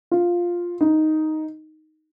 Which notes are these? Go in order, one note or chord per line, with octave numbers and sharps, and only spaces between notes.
F4
D#4